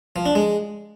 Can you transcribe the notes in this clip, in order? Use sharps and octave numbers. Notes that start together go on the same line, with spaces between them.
F3
D4
G#3